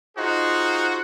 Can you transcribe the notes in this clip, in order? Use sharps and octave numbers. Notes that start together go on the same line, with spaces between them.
D#4 F4 F#4 G#4 C5